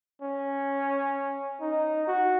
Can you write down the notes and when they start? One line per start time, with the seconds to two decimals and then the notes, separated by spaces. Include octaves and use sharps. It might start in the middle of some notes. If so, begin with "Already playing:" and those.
0.22 C#4
1.61 D#4
2.07 F#4